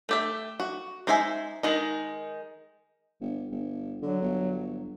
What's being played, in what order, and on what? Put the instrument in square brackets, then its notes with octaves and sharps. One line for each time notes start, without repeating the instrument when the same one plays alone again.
[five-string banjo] A3 G4 E5
F#4
G#3 D#4 C5 E5 G#5
D#3 G#3 D#4
[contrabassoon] G1
G1
[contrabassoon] D3 [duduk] F#3
[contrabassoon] G1